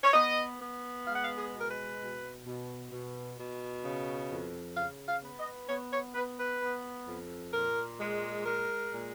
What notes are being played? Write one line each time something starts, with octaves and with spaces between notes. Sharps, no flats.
C#5
B3 D#5
B3
G#3 F5
F#5
F5
G#4
B2
A#4
B4
B2
B2
B2
B2
C#3
F2
C#3 F5
F5
B3
D#5
B3 C#5
C#5
B3 B4
B4
B3
F2
A#2 A#4
G#3
G#3 A#4
A#2